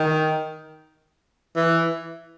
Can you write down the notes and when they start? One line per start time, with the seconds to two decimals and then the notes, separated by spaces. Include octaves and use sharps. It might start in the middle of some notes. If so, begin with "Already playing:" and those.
Already playing: D#3
1.56 E3